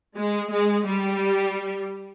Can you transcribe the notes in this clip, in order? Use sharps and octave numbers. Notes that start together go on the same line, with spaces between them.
G#3
G#3
G3